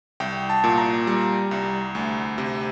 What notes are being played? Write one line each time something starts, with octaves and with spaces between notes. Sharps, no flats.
C2 G5
A5
A#2
A#5
G3
C2
D2
C3